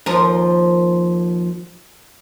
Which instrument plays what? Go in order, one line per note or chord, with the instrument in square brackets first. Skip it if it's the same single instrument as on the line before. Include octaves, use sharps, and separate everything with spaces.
[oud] D#2 F3 A#4